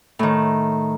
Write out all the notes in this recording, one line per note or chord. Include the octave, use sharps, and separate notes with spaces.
A2 D#3